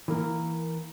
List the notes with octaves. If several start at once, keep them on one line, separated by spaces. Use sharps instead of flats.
E3 A#3 A#4